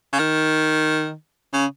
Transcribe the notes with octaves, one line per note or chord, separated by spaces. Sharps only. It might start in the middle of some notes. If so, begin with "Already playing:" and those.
C#3
D#3
C#3